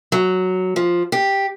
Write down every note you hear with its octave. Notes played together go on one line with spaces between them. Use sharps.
F#3
F3
G4